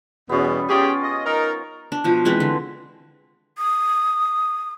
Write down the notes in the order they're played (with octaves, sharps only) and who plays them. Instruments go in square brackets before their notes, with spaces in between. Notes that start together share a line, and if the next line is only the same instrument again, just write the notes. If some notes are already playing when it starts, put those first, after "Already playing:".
[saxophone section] E2 B2 [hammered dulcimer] B3 C#4
[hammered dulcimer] G3
[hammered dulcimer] C#4 F4 [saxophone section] G4 G#4
[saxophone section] D#5
D#4 A#4
[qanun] D4
B2 F3
E3 G#3 C4 B4
D3
[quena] D#6